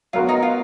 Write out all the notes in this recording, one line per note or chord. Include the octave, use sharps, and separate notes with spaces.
F#3 B3 F4 F#4 A#4
D#4
F4